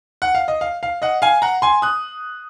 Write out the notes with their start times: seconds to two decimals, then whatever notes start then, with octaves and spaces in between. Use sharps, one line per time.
0.22 F#5
0.35 F5
0.48 D#5
0.61 F5
0.83 F5
1.02 D#5 F#5
1.22 F5 G#5
1.42 F#5 A#5
1.62 G#5 C6
1.82 D#6 F#6